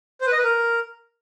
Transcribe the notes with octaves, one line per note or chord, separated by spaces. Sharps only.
C5
B4
D#5
B4
A#4